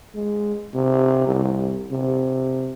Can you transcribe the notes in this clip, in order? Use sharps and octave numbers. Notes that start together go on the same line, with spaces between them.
G#3
C3
C2
C3